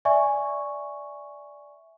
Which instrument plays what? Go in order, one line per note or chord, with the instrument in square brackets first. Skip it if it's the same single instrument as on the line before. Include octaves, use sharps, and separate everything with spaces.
[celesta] D5 E5 G#5 C#6